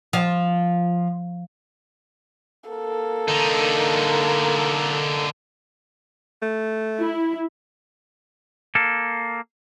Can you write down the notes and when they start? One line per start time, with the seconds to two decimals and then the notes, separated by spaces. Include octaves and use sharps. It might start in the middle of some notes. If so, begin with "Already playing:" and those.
0.13 F3
2.70 A#3 A4
3.28 D3 D#4
6.42 A3
6.99 E4
8.75 A#3 A4